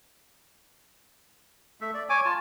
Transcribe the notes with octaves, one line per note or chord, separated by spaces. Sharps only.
A3 E5
D5
C#5 G#5 D6
F4 A5